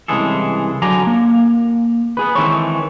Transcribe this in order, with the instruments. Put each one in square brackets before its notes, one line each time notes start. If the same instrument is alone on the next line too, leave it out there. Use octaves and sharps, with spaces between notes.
[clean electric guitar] C2 C#3 E3 G#3 G#4 A4
D3 F#3 D5 G#5 A#5
A#3
B3 G#4 B4
D#3 E3 G#3 C4 A4 C#5